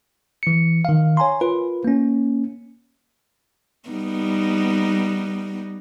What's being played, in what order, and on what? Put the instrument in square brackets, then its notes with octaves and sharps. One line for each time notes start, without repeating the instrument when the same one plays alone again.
[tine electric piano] E3 C#7
D#3 F5
C#5 G#5 A#5 C6
F4 A#4 B4
A#3 C#4
[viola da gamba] G3 B3 D#4